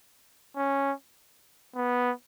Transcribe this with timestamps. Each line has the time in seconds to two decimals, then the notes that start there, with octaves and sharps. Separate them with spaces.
0.57 C#4
1.76 B3